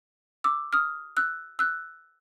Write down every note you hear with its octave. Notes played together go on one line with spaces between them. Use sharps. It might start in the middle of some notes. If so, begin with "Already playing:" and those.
D6 E6
D#6 F6
E6 F#6
E6 F#6